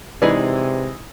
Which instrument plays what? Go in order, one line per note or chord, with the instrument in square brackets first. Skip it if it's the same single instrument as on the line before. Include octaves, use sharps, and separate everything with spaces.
[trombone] C3 [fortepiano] E3 G#3 D#4 [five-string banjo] G#4 B4 D5